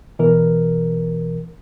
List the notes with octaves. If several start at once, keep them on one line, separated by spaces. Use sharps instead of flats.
B2 E3 A#4